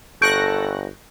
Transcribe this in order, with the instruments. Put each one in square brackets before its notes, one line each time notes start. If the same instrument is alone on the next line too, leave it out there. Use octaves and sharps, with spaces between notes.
[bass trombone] G1 [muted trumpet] A4 [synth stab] C#6 F#6 A#6 [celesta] G6 D7